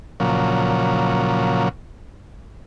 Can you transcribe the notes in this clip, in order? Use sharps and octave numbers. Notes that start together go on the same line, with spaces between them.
A#2 C#3 F3 F#3